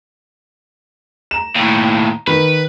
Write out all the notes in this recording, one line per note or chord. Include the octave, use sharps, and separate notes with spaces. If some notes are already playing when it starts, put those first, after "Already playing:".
A#5 E7
D#2 A2
D#3 B4